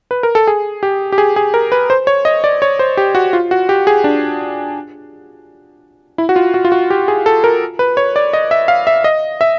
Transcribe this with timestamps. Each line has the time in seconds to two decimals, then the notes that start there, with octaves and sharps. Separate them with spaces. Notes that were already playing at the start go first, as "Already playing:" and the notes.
0.11 B4
0.23 A#4
0.35 A4
0.47 G#4
0.83 G4
1.12 G4
1.18 G#4
1.36 G#4
1.54 A#4
1.72 B4
1.90 C5
2.07 C#5
2.25 D#5
2.44 D5
2.62 C#5
2.79 C5
2.97 G4
3.15 F#4
3.33 F4
3.51 F#4
3.69 G4
3.87 G#4
4.04 D4
6.18 E4
6.29 F#4
6.36 F4
6.54 F#4
6.65 F4
6.72 F#4
6.90 G4
7.08 G#4
7.26 A4
7.44 A#4
7.79 B4
7.97 C#5
8.16 D5
8.33 D#5
8.51 E5
8.68 F5
8.87 E5
9.04 D#5
9.41 E5